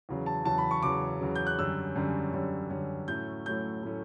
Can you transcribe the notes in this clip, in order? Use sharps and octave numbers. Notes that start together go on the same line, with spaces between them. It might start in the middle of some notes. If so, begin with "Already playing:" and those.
E2 C#3 F#3
A5
E2 C#3 F#3 A5
B5
C#6
E2 C#3 F#3 D6
E2 C#3 F#3
G6
F#6
F#2 D3 G3 C#4 E6
F#2 D3 G3 C#4
F#2 D3 G3 C#4
F#2 D3 G3 C#4
A2 F#3 A3 C#4 G6
A2 F#3 A3 C#4 G6
A2 F#3 A3 C#4